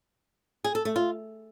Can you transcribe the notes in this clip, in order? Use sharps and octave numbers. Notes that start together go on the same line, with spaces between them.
G#4
A4
A3
F4